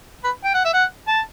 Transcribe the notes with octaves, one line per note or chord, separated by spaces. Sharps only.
B4
G5
F#5
E5
F#5
A5